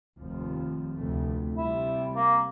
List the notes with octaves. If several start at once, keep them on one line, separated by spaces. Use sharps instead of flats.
F1 D#2 F3
F1 D2 A3
C3 G3 E4
A#3